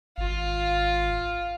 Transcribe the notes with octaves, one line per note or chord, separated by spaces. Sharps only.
G#1 F4